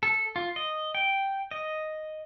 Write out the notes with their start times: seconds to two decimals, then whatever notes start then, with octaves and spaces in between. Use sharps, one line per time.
0.03 A4
0.36 F4
0.56 D#5
0.95 G5
1.51 D#5